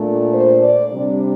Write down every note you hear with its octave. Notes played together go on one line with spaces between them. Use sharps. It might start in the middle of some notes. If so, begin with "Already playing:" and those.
Already playing: A#2 A3 D4
C5
D5
C3 G3 D4